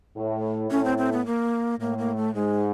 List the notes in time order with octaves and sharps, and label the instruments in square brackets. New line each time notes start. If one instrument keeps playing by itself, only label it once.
[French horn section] A2
[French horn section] A2 [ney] C#4
[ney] C4
C4
B3
A#3
[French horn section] A2 [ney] A#3
[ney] A#3
A3
[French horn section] G#2 [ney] G#3